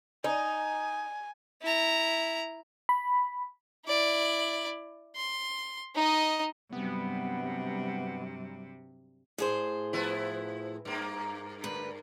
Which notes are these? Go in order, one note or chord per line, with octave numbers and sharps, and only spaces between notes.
D#4 G#5
E4 A#5
B5
E4 D5
C6
D#4 D#5
G2 C3 F#3 G3 B3
A2 G#4 C5
F3 B3 E4
G2 A#3
D2 B4